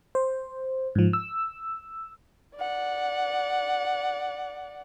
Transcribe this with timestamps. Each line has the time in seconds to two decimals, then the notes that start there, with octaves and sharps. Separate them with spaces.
0.15 C5
0.95 G#2 F3
1.13 E6
2.56 D5 F#5